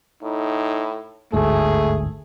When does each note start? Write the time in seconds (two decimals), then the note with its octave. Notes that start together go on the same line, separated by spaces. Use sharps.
0.23 A2 D#4
1.33 G1 D2 G#2 A3 G#4